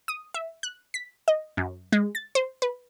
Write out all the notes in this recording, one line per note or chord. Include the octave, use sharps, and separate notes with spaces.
D#6
E5
F#6
B6
D#5
F#2
G#3
A6
C5
B4